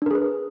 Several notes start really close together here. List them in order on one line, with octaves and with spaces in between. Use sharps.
D4 A#4 G#4 B4